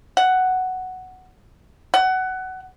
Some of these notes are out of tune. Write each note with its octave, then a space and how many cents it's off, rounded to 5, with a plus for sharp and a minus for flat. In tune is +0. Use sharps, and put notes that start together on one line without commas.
F#5 +5
F#5 +20